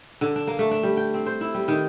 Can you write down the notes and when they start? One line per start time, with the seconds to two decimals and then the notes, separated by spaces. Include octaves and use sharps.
0.21 D3
0.36 D4
0.47 A#3
0.59 A3
0.71 D4
0.83 G3
0.97 G5
1.14 C4
1.26 C5
1.41 E4
1.54 G3
1.68 D#3